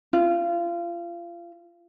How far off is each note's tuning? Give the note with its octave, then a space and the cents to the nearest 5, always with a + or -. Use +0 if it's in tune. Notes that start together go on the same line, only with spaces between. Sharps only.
F4 -30